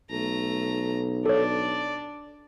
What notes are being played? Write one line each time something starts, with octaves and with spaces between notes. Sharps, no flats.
B1 A3 A#5
D4 A4 C#5 D5